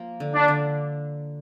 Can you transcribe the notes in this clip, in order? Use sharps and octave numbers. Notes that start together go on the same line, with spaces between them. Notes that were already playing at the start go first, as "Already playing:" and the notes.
Already playing: F3 A#3
D3
D4
D3